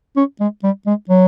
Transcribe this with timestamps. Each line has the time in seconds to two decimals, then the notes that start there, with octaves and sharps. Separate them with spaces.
0.16 C#4
0.40 G#3
0.63 G3
0.87 G#3
1.10 F#3